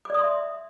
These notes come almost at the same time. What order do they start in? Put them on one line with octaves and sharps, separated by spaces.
D6 D5 D#6 C6 E5